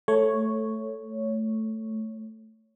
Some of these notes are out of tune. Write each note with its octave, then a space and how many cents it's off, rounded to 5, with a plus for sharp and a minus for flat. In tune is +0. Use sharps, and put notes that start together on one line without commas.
A3 +0 C#5 +0